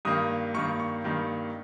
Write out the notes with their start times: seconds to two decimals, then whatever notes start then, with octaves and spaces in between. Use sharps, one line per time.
0.05 G2 D#3 A#3 D#6
0.54 G2 D#3 A#3 C#6
0.80 C#6
1.04 G2 D#3 A#3